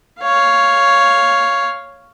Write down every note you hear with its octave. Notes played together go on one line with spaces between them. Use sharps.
C#5 F5